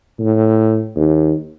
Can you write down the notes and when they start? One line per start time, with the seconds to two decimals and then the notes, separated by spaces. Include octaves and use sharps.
0.20 A2
0.96 D#2